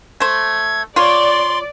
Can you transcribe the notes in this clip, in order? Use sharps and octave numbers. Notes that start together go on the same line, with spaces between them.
A3 C5 G#6
F4 C#5 D5 C6